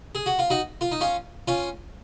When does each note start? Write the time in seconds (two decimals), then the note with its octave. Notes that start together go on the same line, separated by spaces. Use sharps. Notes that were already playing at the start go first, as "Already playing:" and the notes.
0.15 G#4
0.26 F#4
0.39 F4
0.50 D#4 F#4
0.81 F4
0.92 D#4
1.01 C#4 F4
1.48 C#4 F4